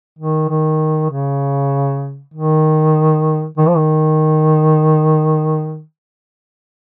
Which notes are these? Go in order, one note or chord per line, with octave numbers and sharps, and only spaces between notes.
D#3
D#3
C#3
D#3
D#3
F3
D#3